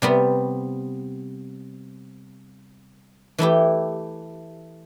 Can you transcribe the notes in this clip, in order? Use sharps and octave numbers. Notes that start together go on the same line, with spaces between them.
C3 G3 B3
E3 A3 E4 G4